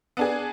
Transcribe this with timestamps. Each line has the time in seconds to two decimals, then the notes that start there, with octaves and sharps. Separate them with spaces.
0.17 B3 D4 G#4